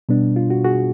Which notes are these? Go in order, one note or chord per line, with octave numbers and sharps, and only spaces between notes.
B2 G3 B3 D4
F4
F#4
F#4 G#4